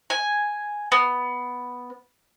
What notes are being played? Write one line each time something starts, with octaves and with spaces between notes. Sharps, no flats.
G#5
B3